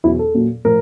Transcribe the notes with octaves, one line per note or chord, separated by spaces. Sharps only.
E2 B2 F#3 E4
A4
A#2 F#3
A2 F3 A#4